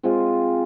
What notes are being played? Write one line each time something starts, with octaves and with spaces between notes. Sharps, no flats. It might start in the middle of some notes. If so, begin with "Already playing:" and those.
G#3 C4 F4 G#4